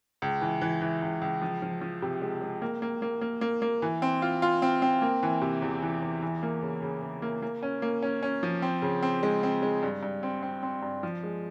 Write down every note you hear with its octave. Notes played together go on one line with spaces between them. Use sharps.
C#2
E3
E3
E3
C#2
C#2
F3
F3
F3
C3
G#3
G#3
A#3
A#3
A#3
A#3
A#3
A#3
E3
C4
F4
F4
C4
C4
A#3
E3
C3
E2
E3
E2
E3
A#3
C#3
C#3
C#3
A#3
A#3
C#4
A#3
C#4
C#4
F3
C4
C#3
C4
G#3
C4
G#3
G2
G2
C4
C4
C4
G2
F3
G#3